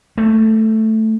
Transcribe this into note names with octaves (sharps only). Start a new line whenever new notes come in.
A3